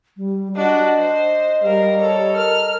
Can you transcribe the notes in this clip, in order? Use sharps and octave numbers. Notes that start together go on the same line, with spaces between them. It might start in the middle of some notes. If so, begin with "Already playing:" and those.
G3
D4 F#4 D#5
C5
G3 A#4 F5
A4 C#5
A#4 F6